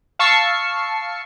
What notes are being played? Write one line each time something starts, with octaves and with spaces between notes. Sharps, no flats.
F5 A5 C#6 E6 C7 C#7